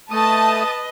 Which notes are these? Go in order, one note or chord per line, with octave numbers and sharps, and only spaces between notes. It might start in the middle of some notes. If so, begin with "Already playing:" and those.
A3 B4 D#5 A5 D#6